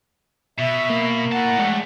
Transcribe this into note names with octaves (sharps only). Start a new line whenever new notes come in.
B2 E5
A#3
E4 F#5 A5
G#3 A3 D5